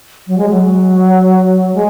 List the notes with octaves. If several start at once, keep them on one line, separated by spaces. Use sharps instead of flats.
F#3
G#3
F#3
G#3